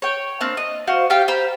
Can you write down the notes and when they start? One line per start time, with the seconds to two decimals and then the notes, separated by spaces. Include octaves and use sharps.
0.02 C#5 G5
0.41 A#3 C4 D4 F#6
0.57 D#5
0.87 F#4 C5 F5
1.10 F4 G4 F5 G5
1.28 C5 A#5 B5